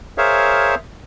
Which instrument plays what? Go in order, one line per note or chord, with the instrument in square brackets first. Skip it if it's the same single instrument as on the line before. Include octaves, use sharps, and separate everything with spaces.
[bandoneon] G#4 A#4 C5 C#5 E5 F5